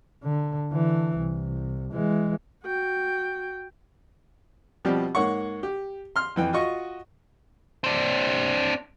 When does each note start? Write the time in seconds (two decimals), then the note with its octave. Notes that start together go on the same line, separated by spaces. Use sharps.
0.23 D3
0.72 D3 E3
1.17 C2
1.93 E3 G#3
2.64 F#4 G5
4.85 B2 F3 G3 C4 G4
5.15 G#2 A#3 C#5 F#5 C#6
5.63 G4
6.16 C6 F6
6.36 F2 E3 G5
6.53 F4 F#4 D#5 C#6
7.84 C4 D4